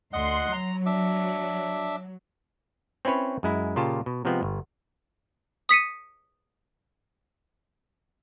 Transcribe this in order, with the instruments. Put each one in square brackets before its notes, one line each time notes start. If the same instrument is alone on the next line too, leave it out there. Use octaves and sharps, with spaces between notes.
[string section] D2 C6 [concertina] D#5 F#5 F#6
[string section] F#3 [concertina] A#5
[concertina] D4 E5 D6
[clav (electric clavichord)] C4 C#4 E4 B4 C#5
F#2 G#3 E4
A#2 C#3 F4 G4 A5
B2
C3 F3 G#3 B3 C4
G1
[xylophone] D#6 B6 C#7 D#7